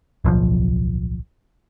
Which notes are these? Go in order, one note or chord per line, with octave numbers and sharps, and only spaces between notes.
D1 B1 F3